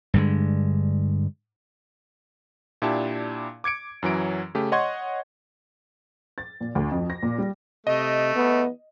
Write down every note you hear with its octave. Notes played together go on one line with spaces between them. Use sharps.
G2 D3 G#3
A#2 D4 E4 G4 A5
D6 G#6 C#7 D7
F#2 E3 F#3 D7
C#3 A3 G4
C#5 D#5 F#5 C6 C#6 G#6
A6
A#2
D2
F2
A#6
A#2
G3
C3 A3 D#5
B3